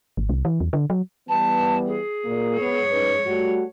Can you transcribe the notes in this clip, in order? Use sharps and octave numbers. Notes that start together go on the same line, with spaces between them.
G#1
C2
E3
E2
D3
F#3
E3 G3 B3 A5
G#4
A#2 A#3
B3 C#5
C#4 D#4 B4
G3 A3 F#4